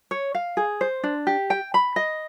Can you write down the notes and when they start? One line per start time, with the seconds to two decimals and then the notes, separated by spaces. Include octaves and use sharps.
0.11 C#5
0.35 F5
0.57 G#4
0.81 C5
1.03 D4
1.27 G4
1.50 G5
1.74 B5
1.96 D#5